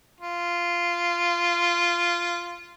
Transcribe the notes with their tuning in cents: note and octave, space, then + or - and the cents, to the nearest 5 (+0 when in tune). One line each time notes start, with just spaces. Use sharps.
F4 -10